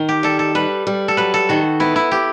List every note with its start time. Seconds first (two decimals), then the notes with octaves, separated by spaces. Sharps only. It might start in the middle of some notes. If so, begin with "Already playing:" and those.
Already playing: D#3
0.09 G4
0.23 G3 A4
0.39 A4
0.55 G3 B4
0.87 G3
1.08 A4
1.17 F#3 B4
1.34 A4
1.49 D#3 F#4
1.80 B3 E4
1.96 E4
2.11 B3 G4